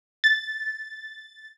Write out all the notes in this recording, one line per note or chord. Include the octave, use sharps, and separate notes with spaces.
A6